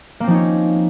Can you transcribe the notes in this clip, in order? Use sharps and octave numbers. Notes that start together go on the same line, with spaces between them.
F3 A#3 C4 C#4 D#4